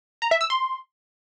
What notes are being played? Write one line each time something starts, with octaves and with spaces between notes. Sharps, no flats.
A#5
E5
E6
C6